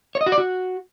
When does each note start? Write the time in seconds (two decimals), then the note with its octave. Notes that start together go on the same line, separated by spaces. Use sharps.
0.15 C#5
0.21 D#5
0.26 F#4
0.32 D5
0.38 F#4